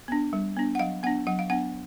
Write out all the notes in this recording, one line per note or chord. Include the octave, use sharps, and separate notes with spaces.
B3 D4
G3
B3 D4
F#5
F#3 F5
B3 D4 F#5
F#3 F#5
F5
B3 D4 F#5